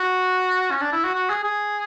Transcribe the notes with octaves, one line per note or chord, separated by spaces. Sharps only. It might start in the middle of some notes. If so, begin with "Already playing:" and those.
Already playing: F#4
C#4
D4
E4
F#4
F#4
G#4
G#4